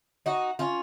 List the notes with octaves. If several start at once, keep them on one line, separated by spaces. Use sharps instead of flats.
D#4 F#4
C#4 F4